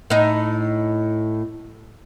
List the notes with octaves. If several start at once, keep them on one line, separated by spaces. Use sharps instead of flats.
A2 D#4